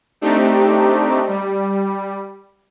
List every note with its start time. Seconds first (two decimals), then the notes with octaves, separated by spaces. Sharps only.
0.21 A3 C4 D4 D#4 G4
1.28 G3